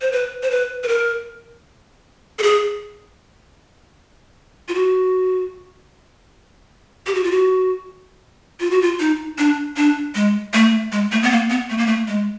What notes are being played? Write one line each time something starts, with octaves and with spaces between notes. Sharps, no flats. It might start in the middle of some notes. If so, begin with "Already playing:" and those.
C5
B4
C5
B4
B4
A#4
A4
G#4
F4
F#4
G4
F#4
F4
F#4
F4
F#4
F4
D#4
D4
D4
G#3
A3
G#3
A3
B3
A#3
B3
A3
A#3
A3
G#3